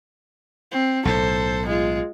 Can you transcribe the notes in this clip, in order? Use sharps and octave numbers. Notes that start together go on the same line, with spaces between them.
C4
B1 A2 A4 C5
G#3 F4